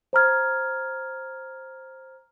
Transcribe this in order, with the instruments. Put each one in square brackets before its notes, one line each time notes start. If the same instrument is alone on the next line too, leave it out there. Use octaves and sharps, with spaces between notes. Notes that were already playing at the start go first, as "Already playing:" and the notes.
[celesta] C5 A#5 F6 G#6